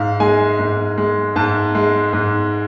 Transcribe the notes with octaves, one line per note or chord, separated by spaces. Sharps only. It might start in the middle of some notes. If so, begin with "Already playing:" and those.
Already playing: G#2 F5
G#3 G#5
G#2
G#3
G#2 A5
G#3
G#2